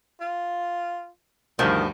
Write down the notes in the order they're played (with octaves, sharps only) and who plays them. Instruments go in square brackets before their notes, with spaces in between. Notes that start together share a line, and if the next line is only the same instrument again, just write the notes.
[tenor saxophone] F4
[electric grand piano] D2 G2 [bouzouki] D#3 [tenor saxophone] F3